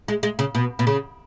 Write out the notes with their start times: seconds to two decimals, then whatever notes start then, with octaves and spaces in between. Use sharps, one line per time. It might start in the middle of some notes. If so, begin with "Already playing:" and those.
0.08 G#3
0.23 G#3
0.39 C#3
0.55 B2
0.79 B2
0.87 C#3